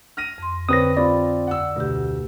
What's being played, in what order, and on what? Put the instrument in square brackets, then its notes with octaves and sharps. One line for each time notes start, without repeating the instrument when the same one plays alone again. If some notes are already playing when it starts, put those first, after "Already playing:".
[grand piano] F6 A#6 D#7
[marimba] F2 C6
[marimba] D3 [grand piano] C4 B4 C#5 [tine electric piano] D#6 A#6
[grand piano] C4 F4 [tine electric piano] D5 [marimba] B5
[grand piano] F#5 E6
[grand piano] D2 [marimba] B2 G4